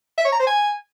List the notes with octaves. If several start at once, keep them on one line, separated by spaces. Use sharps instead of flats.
E5
C#5
A#5
C5
G#5